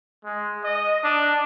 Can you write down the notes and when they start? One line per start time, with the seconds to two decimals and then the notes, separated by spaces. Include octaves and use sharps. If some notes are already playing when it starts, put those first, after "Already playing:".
0.24 G#3
0.64 D#5
1.03 D4